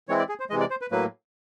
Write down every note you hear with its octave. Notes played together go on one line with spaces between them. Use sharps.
E3 G#3 C4 E4 C#5
D5
G#4
C5
C3 E3 G#3 D#5
D5
C5
B4
A2 F#3 A#3 B4